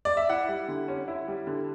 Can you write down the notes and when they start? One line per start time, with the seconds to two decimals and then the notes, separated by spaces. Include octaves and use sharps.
0.05 D5
0.17 E5
0.29 E4 F#5
0.49 G3
0.68 D3
0.88 C#4
1.08 E4
1.28 G3
1.47 D3